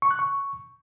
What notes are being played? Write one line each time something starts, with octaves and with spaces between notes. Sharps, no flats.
C#6
F#6
C#6